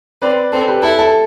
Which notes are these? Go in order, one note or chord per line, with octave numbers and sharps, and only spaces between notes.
C4 B4 D5
C4 A4
G4 B4
E4 A4
A4